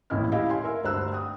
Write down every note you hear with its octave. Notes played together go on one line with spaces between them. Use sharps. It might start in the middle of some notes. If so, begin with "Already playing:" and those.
D#1 A1 C#3 E4 D#5 F6
E4 G4 D#5 F5
C#5 G#5 C6
A#4 E5
D2 G2 C5 A#5 E6 F#6
G5 D#6